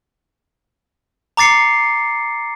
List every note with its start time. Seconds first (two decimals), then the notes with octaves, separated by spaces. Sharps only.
1.37 A#5 D6 A6 C7 C#7